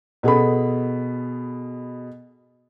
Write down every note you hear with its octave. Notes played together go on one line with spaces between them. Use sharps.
B2 G#4 A4 B5